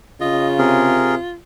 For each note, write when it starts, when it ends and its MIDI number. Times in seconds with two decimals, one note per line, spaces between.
0.21 0.97 49
0.21 1.36 65
0.21 0.48 75
0.59 1.16 48
0.59 1.15 68
0.59 1.15 70